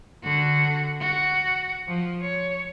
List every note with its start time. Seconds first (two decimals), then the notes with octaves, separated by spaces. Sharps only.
0.23 D3 F#4
1.00 F#4
1.88 F3
2.22 C#5